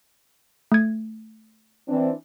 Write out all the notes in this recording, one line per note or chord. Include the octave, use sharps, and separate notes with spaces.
A3 G#6
E3 C4 D4